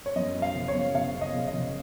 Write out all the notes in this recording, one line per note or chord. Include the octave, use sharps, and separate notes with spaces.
C#5
F#2 D#5
F#2
F5
F#1
C#5
F#2
F#1 F5
C#3
D#5
F#1
D#5
F#1